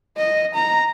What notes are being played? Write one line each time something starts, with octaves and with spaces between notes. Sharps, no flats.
D#5
A#5